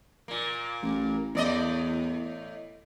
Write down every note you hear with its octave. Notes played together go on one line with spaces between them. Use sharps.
A#2 A#3
A1
E2 A2 D5 D#5